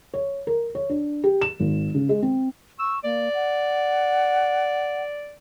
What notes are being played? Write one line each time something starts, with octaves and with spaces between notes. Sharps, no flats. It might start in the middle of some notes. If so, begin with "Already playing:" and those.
C#5
A#4
C#5
D4
G4
E7
G#1
C#3
G#3
C4
C#6 E6
A#3 D5
F#5